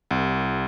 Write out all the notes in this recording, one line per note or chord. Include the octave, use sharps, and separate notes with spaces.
C2